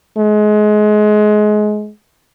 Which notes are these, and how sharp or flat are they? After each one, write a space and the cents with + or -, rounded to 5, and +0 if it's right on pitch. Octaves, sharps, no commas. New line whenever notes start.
G#3 +25